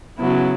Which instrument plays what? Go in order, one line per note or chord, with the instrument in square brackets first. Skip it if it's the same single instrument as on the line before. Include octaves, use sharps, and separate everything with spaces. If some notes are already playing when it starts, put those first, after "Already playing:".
[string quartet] C#3 F#3 B3 E4